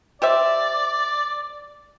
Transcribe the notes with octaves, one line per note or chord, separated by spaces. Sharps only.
G4 C5 D5 E5